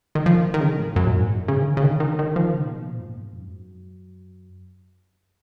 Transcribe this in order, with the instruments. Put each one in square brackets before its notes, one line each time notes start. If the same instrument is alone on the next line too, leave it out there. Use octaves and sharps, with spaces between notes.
[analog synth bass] D#3
F3
D#3
D#3
C#3
G#2
F#2
A#2
G#2
C#3
D#3
C#3
C#3
D#3
D#3
D#3
F3
C#3
A#2
B2
A#2
F#2
G#2
F2
F#2